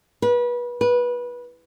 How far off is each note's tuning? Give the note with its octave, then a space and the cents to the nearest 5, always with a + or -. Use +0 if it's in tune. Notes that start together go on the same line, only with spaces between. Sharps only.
B4 -30
B4 -20